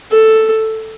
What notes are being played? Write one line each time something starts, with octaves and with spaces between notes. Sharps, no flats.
A4